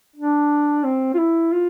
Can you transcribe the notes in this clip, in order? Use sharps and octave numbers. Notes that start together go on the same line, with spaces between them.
D4
C4
F4
E4
F4